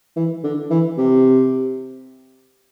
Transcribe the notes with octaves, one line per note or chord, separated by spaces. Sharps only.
E3
D3
E3
C3